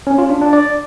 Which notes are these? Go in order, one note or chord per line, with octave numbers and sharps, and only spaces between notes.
C#4
F4
D4
D4
D5